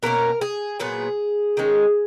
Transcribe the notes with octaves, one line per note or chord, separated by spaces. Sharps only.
B2 A#3 C#4 A#4
G#4
A#2 F#3 B3 G#4
D#3 G#3 C#4